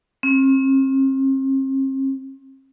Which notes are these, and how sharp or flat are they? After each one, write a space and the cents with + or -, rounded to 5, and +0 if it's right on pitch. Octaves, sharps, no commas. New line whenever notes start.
C4 +40